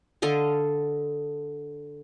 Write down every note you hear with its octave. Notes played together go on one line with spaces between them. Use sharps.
D3 A4 D#5 F5